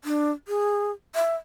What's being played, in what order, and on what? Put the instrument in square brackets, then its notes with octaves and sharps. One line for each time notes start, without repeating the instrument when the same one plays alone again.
[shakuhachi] D4
G#4
E5